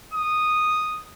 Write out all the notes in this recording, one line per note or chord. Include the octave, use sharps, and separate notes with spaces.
D#6